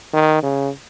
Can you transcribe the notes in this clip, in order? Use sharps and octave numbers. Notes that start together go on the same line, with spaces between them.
D#3
C#3